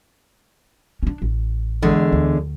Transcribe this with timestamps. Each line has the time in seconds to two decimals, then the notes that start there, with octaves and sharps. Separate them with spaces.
1.03 C#4 D4
1.22 A1
1.82 E2 D3 G#3
2.12 D2